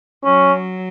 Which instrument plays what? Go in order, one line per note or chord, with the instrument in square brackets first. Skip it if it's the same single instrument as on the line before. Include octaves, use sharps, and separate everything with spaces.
[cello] F#3 [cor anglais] C#4